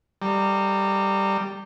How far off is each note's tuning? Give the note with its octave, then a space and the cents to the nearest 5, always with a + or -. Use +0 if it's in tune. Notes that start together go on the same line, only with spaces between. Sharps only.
G3 +0 A#5 -30